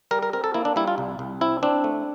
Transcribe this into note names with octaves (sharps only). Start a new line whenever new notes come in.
G3 A#4
A#4
C4 A#4
A4
A#3 E4
D4
G3 E4
F4
C2
C2
C4 E4
C4 D4
A3